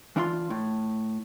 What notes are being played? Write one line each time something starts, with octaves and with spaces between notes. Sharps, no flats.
E3 D4 E4 F4 F5 C6
A2